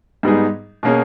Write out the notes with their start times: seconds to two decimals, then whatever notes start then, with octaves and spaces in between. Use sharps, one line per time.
0.23 G#2 G3 B3 D#4 G#4
0.83 B2 A#3 C#4 G#4